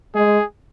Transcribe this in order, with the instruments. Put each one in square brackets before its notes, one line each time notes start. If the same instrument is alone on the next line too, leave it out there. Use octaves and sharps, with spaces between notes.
[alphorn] G#3 [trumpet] G#4